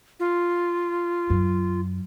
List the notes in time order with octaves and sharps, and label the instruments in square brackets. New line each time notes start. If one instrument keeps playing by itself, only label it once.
[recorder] F4
[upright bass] F#2